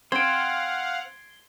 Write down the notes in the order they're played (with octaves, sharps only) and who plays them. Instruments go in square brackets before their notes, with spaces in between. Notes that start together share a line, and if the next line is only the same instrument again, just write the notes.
[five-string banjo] C4 [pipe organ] F5 F#5 [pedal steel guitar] C6 [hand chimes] G#6 D7